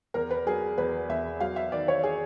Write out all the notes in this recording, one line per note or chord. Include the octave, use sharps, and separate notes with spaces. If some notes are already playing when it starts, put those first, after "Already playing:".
E2 A#4
B4
F#3 G#4
E2 B4
E2 E5
F#3 F5
E5
D#3 D5
C#5
G#4